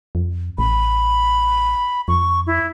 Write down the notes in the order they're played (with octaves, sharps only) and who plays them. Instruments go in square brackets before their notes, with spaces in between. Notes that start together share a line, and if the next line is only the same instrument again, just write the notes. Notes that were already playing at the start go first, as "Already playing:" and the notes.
[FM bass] F2
[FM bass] A1 [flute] B5
[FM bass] F2 [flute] C#6
[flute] E4